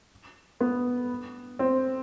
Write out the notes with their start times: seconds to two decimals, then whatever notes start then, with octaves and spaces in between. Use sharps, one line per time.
0.61 B3
1.59 C4